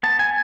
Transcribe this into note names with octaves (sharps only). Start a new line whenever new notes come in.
B3 A5
G#5